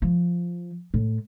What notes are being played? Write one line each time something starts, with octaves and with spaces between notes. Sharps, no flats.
F3
A2